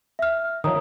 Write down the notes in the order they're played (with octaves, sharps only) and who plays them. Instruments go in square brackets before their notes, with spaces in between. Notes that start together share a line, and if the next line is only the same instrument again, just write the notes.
[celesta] E5 F6
[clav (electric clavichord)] D#3 F3 [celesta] C#5 A#5 D#6